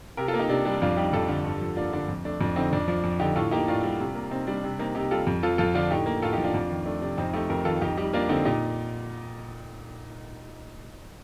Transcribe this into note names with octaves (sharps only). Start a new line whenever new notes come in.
C3 G4 A#4
F4 A4
A#3
D#4 G4
C3 D4
G3 D4
F2 D4 F4
G3 D#4 G4
F2 F4 A4
D3
G2
F3
A#3 D4 F4
D3 D4
F2
A3 D4
F2 D4
D3 C4 D#4
F2 D4
F3 D4
F2
D3 D#4 G4
A2 F4 A4
A#3 D#4 G4
A2 D4 F4
G3
C3
A#3
C3 C4 D#4
G3 D4
C3 D4
A#3 C4 D#4
C3 D#4 G4
G3 F4 A4
F2
F3 F4 A4
F2 F4 A4
D3 D4 F4
A2 D#4 G4
A#3
A2 F4 A4
D#4 G4
F3
D4 F4
F2
D#3
A3 D4
C3 D4
F2 C4 D#4
A3 D#4 G4
F2 G4 A#4
D#3 F4 A4
F2 D#4 G4
G3 D#4 G4
A#3 D4 F4
D3 C4 D#4
A#2 D#4 G4